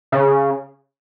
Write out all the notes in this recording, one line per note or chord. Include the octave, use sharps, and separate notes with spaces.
C#3